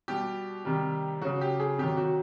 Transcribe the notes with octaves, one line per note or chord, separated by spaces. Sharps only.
B2 G3 G4
C3 D#3 G3
C#3 F#3 F#4
G4
G#4
C3 D#3 F#3 G4
F#4